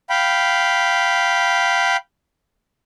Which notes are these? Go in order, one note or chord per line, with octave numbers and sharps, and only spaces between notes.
F5 G5 B5